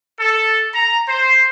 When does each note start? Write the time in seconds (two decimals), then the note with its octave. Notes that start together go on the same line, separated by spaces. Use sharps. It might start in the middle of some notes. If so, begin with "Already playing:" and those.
0.20 A4
0.74 A#5
1.08 C5